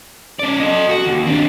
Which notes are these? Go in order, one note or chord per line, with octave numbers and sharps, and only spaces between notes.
C#4 D5
A4 D#5
F#4
D#2
C4 D4